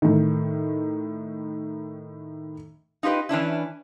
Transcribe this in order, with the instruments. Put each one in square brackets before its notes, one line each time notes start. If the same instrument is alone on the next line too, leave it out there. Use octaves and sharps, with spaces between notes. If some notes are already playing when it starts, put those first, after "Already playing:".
[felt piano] A2 D#3
[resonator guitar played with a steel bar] D#4 F4 G4 B4 D#5
E3 C#4 D4 E4